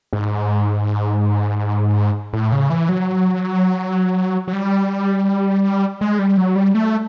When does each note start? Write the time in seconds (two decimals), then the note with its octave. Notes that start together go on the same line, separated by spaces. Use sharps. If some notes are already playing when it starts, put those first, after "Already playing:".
0.13 G#2
2.33 A2
2.52 C#3
2.70 E3
2.89 F#3
4.48 F#3
4.53 G3
6.01 G#3
6.19 G3
6.37 F#3
6.56 G3
6.75 A3